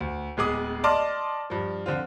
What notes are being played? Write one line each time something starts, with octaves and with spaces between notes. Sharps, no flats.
D2
D1 G#3 B3 G#4 D6 D#6
D5 D#5 A5 C6 D6 F6
G2 F3
D3 F3 C4 F4